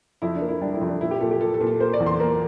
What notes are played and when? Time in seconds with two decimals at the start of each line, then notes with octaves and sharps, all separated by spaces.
0.22 F2 E4
0.35 D4
0.42 A#3
0.48 E4
0.61 G3 D4
0.74 E4
0.81 F2
0.88 D4
1.01 A#2 E4
1.11 G4
1.21 A#2 A4
1.31 G4
1.41 A#2 A4
1.54 A4
1.61 A#2
1.67 A4
1.80 A#3 C5
1.93 D5
2.00 E2
2.06 C6
2.20 A#3 A#5